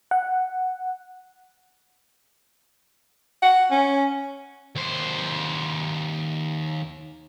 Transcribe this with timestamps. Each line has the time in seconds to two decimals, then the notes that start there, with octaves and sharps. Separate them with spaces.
0.11 F#5
3.42 F#5
3.71 C#4
4.76 D#2 C5